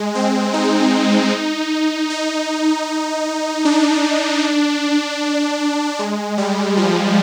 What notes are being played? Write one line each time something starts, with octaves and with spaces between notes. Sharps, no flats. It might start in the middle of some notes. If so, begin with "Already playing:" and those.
Already playing: G#3
C4
D#4
D#4
D4
G#3
G3
F3